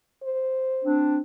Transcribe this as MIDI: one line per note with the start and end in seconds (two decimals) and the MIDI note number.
0.23 1.04 72
0.84 1.20 60
0.84 1.20 62